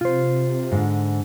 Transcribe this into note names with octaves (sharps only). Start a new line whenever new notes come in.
C3 F4 C5
G#2 D3